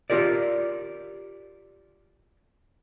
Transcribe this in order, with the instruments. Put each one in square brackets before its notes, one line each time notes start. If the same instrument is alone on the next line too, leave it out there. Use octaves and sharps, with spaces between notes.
[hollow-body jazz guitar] F4 G4 A#4 D5